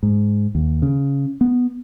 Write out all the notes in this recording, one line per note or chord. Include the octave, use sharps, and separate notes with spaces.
G#2
D#2
C#3
B3